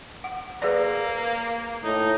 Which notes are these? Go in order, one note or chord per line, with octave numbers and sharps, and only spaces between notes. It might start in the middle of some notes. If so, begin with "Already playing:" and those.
F#5
A#3 G#4 B4 D5
A2 D#4